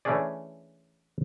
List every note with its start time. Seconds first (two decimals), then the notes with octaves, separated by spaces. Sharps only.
0.05 E3 A3 C#4 D4 G#4 D5